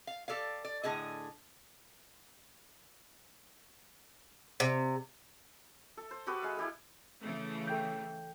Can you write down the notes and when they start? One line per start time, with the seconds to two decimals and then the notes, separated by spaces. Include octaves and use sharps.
0.07 F5
0.28 G4 A4 D5 F5
0.64 D5
0.84 A2 D3 G#4 D#5
4.60 C3
5.97 A4
6.11 C5
6.27 F#4 G4 A4 B4
6.42 G#3 F5
6.57 E4 G4 A4
7.21 C#3 E3 A3
7.67 A4 G5 G6